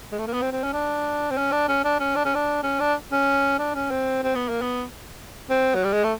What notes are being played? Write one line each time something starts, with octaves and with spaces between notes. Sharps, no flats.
G#3
A3
A#3
B3
C4
C4
C#4
D4
C4
C#4
D4
C#4
D4
C#4
D4
C#4
D4
C#4
D4
C#4
D4
C#4
C4
C4
B3
A#3
B3
C4
F#3
G3
G#3
A3